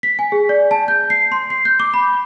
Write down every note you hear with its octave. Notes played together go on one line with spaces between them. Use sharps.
B6
G#5
G#4
D5
A5
G6
C7
C6
C7
G6
D6
B5